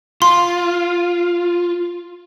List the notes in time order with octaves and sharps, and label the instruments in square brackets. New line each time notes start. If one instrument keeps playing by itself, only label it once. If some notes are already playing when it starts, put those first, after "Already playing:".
[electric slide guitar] F4 [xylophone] C6